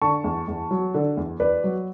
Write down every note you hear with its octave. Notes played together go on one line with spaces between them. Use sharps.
D3 A5 C#6
E2
E2
F#3
D3
E2
E2 B4 D5
F#3